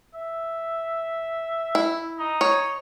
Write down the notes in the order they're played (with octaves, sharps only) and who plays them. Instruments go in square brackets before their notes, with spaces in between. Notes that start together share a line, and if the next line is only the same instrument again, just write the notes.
[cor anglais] E5
[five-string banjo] E4
[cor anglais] D#4
[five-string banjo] C#5